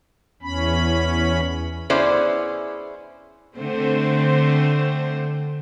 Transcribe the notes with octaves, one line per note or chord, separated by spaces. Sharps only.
E2 C#4 B5
B3 C#4 E4 G#4 C5 D5
D3 A3 C4 C5